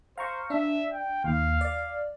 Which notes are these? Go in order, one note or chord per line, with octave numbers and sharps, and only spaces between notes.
C5 F5 A#5 C#6
D4 E5
G5
D#2 F5
D5